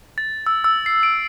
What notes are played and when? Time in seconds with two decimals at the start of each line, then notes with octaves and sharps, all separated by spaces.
0.18 A6
0.46 E6
0.64 E6
0.86 C7
1.03 D7